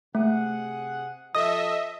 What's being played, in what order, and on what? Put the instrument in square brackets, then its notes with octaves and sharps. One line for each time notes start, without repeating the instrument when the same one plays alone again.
[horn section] C3 G#4 F#5 [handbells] A3
[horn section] F3 A4 [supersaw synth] D#5 E5 [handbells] D#6